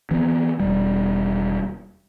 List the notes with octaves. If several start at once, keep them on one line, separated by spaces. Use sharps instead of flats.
E3 B3 C4
E1 G3